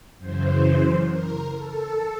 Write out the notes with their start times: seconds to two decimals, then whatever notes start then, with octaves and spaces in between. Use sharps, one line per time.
0.18 F#2 C#3 E3 C5
1.09 A#4
1.54 A4